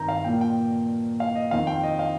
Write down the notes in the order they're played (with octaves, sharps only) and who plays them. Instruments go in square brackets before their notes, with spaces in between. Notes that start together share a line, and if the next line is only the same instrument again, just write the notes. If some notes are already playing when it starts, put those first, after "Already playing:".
Already playing: [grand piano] G2 D#3 C4 A#5 G6
F5
A#2 F3 A#3 G5
G5
F5
D#5
F2 D#3 C4 F5
G5
D#5
F5